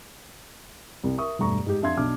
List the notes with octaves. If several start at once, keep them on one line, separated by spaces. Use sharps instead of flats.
C2
A#4 E5 C#6 D#6
E1 G2 G3 A3 A#5 C#6
G#2 G4
F2 D4 E5 F5 C6 G#6
B1 D4 D6 F6